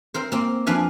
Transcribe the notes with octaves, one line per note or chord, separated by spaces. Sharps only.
C4 A#4 C5
A#3 C4
F2 D4 B4 F5 G#5